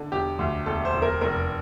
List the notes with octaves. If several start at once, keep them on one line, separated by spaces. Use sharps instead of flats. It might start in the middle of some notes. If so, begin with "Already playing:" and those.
Already playing: D3
E1 G4
D2
E1 A4
C5
E1
A#4
F1 A#4